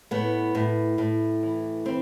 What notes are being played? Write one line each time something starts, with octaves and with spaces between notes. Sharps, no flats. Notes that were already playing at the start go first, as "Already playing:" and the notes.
A2 B3
A2
A2
E3
E3 C4